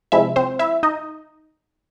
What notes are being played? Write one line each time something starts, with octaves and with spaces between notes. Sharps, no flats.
C3 F3 G#3 E4 E5
C4 C5
E4 E5
D#4 D#5